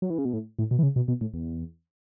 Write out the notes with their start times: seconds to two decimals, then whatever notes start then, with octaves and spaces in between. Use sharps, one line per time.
0.02 F#3
0.10 E3
0.18 C#3
0.25 B2
0.33 A2
0.59 A2
0.71 B2
0.79 E3
0.83 C#3
0.96 B2
1.08 B2
1.21 A2
1.34 E2